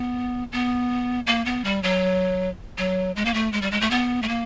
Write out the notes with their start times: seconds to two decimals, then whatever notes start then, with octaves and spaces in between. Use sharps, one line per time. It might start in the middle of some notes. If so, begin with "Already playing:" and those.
Already playing: B3
0.52 B3
1.27 A#3
1.46 B3
1.64 G3
1.83 F#3
2.78 F#3
3.16 G#3
3.25 A#3
3.34 A3
3.53 G#3
3.62 G3
3.71 G#3
3.81 A3
3.91 B3
4.22 A3
4.28 A#3